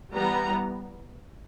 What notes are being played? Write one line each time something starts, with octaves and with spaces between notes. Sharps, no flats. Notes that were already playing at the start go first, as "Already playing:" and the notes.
E3 G3 B3 A#5